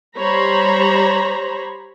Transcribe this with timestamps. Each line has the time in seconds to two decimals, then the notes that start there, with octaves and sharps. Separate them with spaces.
0.16 G3 C5 C#5 A#5 B5